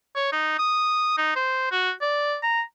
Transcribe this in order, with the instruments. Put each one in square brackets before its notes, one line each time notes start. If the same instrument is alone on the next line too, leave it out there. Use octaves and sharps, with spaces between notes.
[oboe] C#5
D#4
D#6
D#4
C5
F#4
D5
A#5